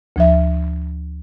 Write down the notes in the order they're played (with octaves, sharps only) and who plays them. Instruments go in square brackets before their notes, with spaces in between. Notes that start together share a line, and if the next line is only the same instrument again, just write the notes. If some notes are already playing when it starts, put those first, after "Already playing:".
[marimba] D2 F3 E5